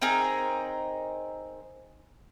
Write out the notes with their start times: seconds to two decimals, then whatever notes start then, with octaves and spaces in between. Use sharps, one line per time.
0.02 C4 D#4 G#4 A#4